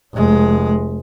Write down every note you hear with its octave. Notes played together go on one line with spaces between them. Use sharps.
F1 G#3